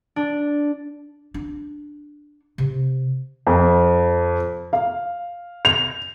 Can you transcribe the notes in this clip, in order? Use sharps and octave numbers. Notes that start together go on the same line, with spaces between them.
D4
D4
C3
F2
F5
F7